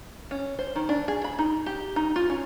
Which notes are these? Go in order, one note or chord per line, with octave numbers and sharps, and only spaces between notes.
C#4
C5
D#3
D4
G#4
B5
D#4
G4
D#4
F4
C#4